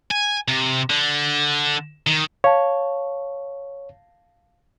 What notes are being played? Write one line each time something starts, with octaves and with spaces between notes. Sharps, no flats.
G#5
C3
D3
D#3
C#5 F5 A5